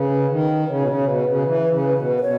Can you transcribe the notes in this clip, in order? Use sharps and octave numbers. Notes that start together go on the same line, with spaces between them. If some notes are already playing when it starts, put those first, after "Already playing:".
Already playing: C#3 B4
D#3
C#3 C#5
B2
C#3
B2 B4
C#3
E3
C#3
B2
B4
B2 C#5